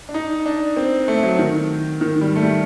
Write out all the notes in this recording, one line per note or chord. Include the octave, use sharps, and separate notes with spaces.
D4
D#4
D4
C4
A3
F#3
D#3
D#3
G3
A3
G3